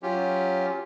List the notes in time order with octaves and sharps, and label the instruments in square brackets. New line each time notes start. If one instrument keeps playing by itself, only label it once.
[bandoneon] F#3 C#4 F4 G4